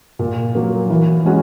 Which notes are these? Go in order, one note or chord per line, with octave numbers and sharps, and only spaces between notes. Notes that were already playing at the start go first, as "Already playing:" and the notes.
A#2
F#3 A#3
E3
G#3 C#4 F#4